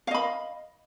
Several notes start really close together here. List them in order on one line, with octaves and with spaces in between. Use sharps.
F5 D#5 B5